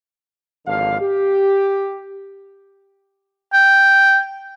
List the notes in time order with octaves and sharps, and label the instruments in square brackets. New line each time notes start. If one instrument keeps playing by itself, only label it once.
[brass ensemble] G#1 D3 F3 F5
G4
[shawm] G5